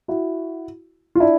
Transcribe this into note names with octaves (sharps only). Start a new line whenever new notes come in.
E4 F#4
F4
D4 E4